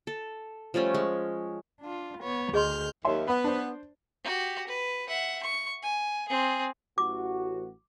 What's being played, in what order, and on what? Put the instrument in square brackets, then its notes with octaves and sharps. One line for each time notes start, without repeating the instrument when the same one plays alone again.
[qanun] A4
F3 G3 A3 C#4
G#3
[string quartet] D4 F4
B3 C#5
[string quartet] D2 F6 G6 [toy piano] G#4 D#5 C6
[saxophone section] D#2 [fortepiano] C#5 E5 C6
[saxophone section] B3 [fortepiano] B5
[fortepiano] D4 C5
[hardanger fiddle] F#4 G4
B4
E5 F#5
C#6
G#5
C4 G#4
[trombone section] A1 F#4 [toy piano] D6